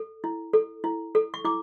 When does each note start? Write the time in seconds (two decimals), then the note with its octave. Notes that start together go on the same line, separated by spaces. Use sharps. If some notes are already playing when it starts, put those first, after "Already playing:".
Already playing: A4
0.24 E4
0.53 A4
0.84 E4
1.15 A4
1.34 C#6
1.45 E4 D6